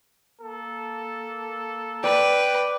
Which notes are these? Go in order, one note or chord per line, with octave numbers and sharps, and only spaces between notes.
A#3 A4
B4 D5 G5